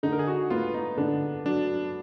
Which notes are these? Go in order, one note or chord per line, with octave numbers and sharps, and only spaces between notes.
D3 D#4
A#4
G#4
F#4
B3 F4
D#4
D3 D4
F#3 D4